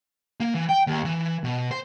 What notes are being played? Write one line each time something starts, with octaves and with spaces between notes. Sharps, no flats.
A#3
E3
G5
D#2
E3
B2
C5